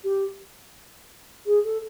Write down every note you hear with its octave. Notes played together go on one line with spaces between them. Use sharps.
G4
G#4
A4